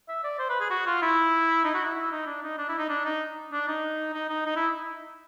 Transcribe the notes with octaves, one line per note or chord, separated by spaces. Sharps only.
E5
D5
C5
B4
G#4
F#4
F4
E4
D#4
F#4
E4
E4
D#4
D4
D#4
D4
E4
D#4
D4
D#4
D4
D#4
D#4
D#4
D#4
E4